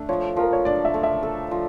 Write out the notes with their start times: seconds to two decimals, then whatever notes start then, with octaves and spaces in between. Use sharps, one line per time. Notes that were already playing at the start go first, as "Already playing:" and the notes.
Already playing: A3 D4
0.09 F3 C#5
0.37 F3 A#4
0.53 C#5
0.65 D4 D5
0.85 E5
0.94 A3
1.03 E5
1.23 A4
1.51 F3